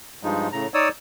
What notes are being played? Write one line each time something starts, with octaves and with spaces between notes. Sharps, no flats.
G2 F3 G#3 D#4
A2 C#3 A#5
D#4 C#5 D5 D#6 E6